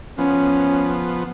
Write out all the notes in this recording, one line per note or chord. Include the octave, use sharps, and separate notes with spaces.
F3 B3 C#4